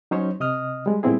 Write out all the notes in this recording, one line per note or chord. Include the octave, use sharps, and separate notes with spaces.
F#3 C#4 D#4 C5 C#5
C3 D#5 D#6 F6
G3 G#3
A#2 G3 B3 C4 E4 G#4